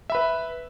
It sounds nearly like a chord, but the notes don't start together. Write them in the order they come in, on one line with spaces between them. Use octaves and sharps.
E5 B5 B4